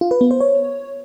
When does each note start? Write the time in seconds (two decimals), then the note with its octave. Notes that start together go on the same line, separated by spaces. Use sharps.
0.01 F4
0.11 B4
0.21 B3
0.31 C5
0.41 C#5